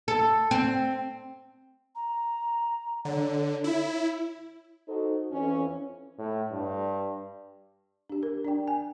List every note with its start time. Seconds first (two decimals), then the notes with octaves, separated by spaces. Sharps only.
0.08 A4
0.51 C4
1.95 A#5
3.05 D3 C#5
3.64 E4
4.88 D#4 F#4 A4 C5
5.32 F2 E3 C#4
6.18 A2
6.51 G2
8.10 D4 G4
8.23 A#4
8.45 D4 D5 G5
8.68 G#5